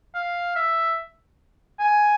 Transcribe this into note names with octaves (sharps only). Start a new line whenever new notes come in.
F5
E5
G#5